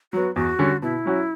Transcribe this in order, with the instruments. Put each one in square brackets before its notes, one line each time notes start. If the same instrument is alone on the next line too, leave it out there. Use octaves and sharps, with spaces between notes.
[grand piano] F#3 B3 [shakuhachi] F#4
[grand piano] E2 [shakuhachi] F#4
[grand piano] D3 G3 C#4
[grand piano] B2 [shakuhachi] E4
[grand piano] F#3 C#4 F#4